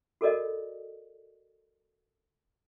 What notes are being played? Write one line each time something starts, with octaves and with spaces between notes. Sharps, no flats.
F#4 A4 A#4 D5 D#5